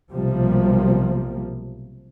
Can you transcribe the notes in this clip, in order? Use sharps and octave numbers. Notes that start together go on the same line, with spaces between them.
B1 C3 F3 G3 A#3